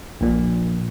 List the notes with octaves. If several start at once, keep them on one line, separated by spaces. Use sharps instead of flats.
A#1 A#2